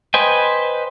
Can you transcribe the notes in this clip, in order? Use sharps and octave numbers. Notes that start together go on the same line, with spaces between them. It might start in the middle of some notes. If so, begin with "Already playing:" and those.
B4 C5 D#5 G5 G#5